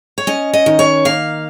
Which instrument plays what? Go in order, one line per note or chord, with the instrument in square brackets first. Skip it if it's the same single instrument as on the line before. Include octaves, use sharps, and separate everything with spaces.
[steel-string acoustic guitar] C#5
C#4 D#5
D#5
D#3
C#5
A#3 F5